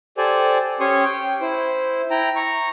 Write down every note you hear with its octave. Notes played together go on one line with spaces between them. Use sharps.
G4 A4 C5 D5 G#5
C#4 G4 C#5 C6 C#6 D#6
G5
E4 C5
E4 G5 A#5
A#5 C#6